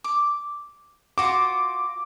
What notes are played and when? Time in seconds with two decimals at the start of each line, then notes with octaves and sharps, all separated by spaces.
0.04 D6
1.18 F4 F#4 C5 D6